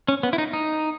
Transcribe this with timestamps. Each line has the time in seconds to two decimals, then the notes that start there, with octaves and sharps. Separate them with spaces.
0.08 C#4
0.23 B3
0.33 E4
0.38 D#4
0.53 D#4